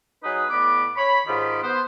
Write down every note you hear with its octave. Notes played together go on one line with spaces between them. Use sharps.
F#3 D#4 G#4 B4
A2 B3 D5 B5 D6
C#5 B5
G#2 D#3 D#4 F4 G4 B5
B3 C5